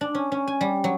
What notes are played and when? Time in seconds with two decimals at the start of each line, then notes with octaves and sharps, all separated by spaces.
0.01 D4
0.15 C#4
0.32 C#4
0.47 G#5
0.61 G3
0.84 F#3